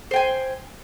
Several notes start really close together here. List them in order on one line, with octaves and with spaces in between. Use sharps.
C5 G5 G#5